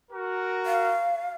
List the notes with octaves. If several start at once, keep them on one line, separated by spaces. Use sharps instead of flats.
F#4 A#4
F5